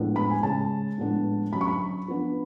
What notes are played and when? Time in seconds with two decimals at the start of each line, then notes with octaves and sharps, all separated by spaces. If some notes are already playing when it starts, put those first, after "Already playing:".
Already playing: A2 F3 G#3 B3 D4
0.16 B5
0.30 G#5
0.43 C#3 G#3 C#4 A5
0.98 A2 F3 G#3 B3 D4
1.53 D3 F#3 C#4 B5
1.61 C#6
1.68 B5
2.08 F3 B3 D4